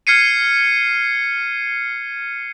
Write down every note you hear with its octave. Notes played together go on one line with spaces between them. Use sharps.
F6 G#6 C7 C#7 D#7